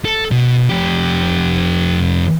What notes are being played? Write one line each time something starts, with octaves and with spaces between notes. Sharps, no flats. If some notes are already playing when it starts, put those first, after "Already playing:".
A4
B2
F2 G4